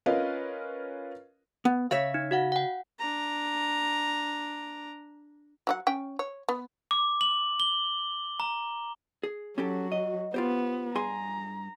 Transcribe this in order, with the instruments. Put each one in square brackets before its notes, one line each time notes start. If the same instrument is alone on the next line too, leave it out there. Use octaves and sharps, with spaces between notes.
[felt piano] C#4 F4 A#4 B4 D#5 F5
[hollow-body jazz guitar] B3
[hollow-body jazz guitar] C#3 C#5 E5 [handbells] F5 B6
[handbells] D#4
F#4 F5 F#5
F#5 G5
[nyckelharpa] D4 A#5
[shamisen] F#3 F#4 F#5
C#4 G5
C#5
B3
[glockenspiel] D6
F#7
G7
A#5
[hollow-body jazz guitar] G#4
[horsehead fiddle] F#3 F#4 [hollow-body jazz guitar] C#4 G4 A4
[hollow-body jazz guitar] D#5
[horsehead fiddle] B3 [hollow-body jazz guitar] F4 G4 C5
[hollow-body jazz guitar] G2 G#4 C6 [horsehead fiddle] A#5